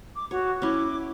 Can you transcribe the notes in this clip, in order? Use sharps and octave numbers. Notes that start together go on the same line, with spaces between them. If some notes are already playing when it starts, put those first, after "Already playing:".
D6
F#4 C#5
C#4 E4 D6